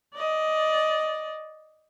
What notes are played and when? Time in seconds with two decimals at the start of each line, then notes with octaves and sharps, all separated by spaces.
0.14 D5 D#5